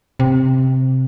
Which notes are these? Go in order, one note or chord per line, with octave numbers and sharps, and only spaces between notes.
C3